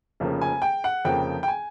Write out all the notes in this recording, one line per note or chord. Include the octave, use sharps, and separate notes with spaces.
F1 F2 C#3 F3 A#3
G#5
G5
F#5
F1 F2 C#3 F3 A#3 G5
G5
G#5